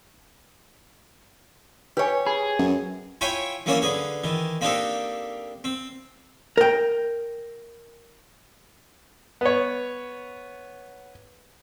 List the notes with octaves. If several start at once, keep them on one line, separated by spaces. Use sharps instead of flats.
G4 B4 C#5 G5 G#5
G#4 B5
F#2
E4 F4 C#5 E5 G5 G#5
E3 F#3 A#3 C#4 F#4 D5
D3 G#4 B4
D#3 E3
A#3 C4 D4 D#4 G4 A4
C4
A#4 G5
B3 C#5